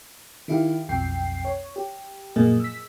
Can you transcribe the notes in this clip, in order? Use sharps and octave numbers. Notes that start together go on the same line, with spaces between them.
D#3 E4 G4 F5
B1 F2 G5 C7
C#5
G4
F#2 A#2 F3 A#3 G#4 D#5
E6 B6